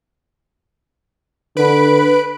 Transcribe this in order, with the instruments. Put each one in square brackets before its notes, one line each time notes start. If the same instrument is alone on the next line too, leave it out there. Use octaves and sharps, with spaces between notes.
[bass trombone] D3 [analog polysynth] B4 B5 D7